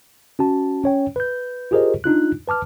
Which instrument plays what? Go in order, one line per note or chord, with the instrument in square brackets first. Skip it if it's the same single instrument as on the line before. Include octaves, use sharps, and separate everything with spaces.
[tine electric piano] C#4 F#4 A5
C#4 C#5 G5
B4 G6
F4 G4 G#4 A#4 C5 D#5
D4 D#4 F4 F#6
B4 A5 D6 F6